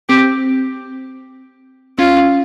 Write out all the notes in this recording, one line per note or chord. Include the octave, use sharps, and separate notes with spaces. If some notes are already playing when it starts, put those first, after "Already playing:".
C4 G4
C#4 F4